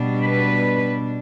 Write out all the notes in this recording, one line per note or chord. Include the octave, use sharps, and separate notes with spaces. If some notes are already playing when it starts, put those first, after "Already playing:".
Already playing: B2 G3 D4
B4